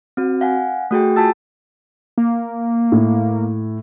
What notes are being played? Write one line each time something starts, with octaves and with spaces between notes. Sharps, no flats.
C4 F#4
F5 F#5 G#5
A3 F#4 G#4 G5
F4 G#5 A5 E6 A6
A#3
A2